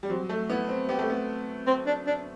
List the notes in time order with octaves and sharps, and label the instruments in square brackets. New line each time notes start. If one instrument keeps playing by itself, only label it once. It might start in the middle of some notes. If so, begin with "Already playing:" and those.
[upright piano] G3
[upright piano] F#3 [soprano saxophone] C4
[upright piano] A3
[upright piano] B3 [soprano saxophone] E4
[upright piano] C4
[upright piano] B3 [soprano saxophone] G4
[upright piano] A3
B3
[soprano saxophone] C4
D4
D4